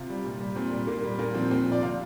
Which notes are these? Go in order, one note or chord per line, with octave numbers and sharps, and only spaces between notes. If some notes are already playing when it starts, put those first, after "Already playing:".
Already playing: C3 F4
G3
A#2
G3
A#2 C4
G3
A#2 A#3
G3
A#2 A#3
F3 C4
A#2 C4
F3
D5
C3 F5